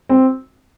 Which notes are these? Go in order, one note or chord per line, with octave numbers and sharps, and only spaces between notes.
C4